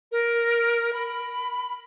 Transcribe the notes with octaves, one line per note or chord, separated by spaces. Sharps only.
A#4
B5